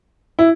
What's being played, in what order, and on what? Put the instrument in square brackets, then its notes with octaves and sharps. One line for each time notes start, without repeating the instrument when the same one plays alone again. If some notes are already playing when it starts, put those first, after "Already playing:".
[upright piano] E4